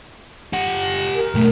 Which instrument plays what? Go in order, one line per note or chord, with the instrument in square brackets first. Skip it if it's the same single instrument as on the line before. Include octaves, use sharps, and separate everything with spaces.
[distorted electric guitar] G4 F#5
[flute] A#4
[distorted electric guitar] B1 A3